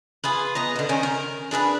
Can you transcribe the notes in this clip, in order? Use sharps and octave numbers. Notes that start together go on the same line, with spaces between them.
F4 G#4 B4
B3 D#5 A#5
B2 D3
D#3 C#4 A#4 C5
A#4
D4 G#4 A#4 B4